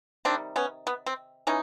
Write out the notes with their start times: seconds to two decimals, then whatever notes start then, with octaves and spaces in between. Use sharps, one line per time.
0.25 C3 D#3 G3 C4 D4
0.56 B3 C#4
0.87 B3
1.06 C4
1.47 E3 C#4 D#4